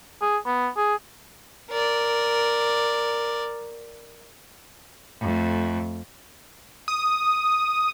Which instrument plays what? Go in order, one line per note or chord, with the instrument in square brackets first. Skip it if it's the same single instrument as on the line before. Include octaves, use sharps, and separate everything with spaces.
[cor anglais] G#4
B3
G#4
[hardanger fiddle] A#4 D5
[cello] F2 A3
[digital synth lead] D#6